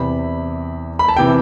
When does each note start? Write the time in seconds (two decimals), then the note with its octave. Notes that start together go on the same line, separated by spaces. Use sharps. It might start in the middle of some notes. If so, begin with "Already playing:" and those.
Already playing: E2 C3 E3 B5
0.99 B5
1.08 A5
1.16 C3 E3 G5